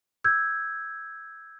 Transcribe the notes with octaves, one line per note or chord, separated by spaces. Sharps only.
E6 G6 G#6